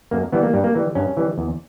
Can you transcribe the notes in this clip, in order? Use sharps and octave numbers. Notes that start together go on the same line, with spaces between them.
F#2 A#3
E3 G3 B3
A#3
G2 G3
A#3
E3 G3
G2 C#4
E3 G3
E2